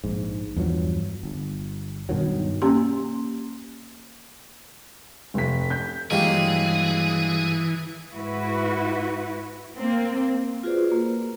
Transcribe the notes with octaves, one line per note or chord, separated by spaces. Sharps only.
A#1 G#2
E2 G2 F3 F#3
G1
G2 B2 D#3 F#3
A#3 C#4 G4 C6
F1 B6
G6 B6
G2 E3 F#3 G#3 A#3 G4 G#4
G#2 E4 F#4 B4
A#3 C4
F4 F#4 G#4 B4 C5 D5
A#3 A#4